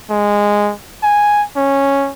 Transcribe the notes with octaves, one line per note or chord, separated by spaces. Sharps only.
G#3
G#5
C#4